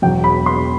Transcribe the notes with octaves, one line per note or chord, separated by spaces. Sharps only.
E1 E2 B2 F#3 G5
B5
C6